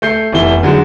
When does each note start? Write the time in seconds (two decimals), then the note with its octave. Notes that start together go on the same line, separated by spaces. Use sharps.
0.02 A3 G6 C7
0.32 F1 E2 E4 G7
0.63 D3 F3 F#3 G#3